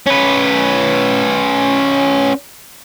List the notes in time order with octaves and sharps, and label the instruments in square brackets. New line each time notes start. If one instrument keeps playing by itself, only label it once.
[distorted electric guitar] C#4 B4